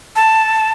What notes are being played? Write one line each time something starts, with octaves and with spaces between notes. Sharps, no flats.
A5